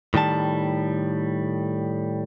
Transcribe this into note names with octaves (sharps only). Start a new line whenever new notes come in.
A2 D#3 G3 A5